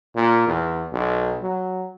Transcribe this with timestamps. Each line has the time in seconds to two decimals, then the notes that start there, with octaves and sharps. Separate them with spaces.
0.16 A#2
0.47 E2
0.92 B1
1.42 F#3